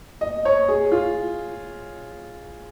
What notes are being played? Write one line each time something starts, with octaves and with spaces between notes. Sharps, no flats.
D#5
C#5
G#4
F4